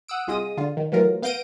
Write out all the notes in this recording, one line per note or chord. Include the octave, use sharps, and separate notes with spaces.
F#5 D#6 E6 D7
C2 F4 G#4 D#5 D#6
D3 F4
D#3
E3 F#3 A3 F4 A#4
B3 F5 G6 A#6 D7 D#7